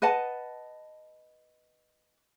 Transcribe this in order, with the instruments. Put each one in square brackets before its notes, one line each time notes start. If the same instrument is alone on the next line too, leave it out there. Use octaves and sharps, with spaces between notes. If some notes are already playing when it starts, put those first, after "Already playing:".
[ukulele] B4 D#5 F#5 A5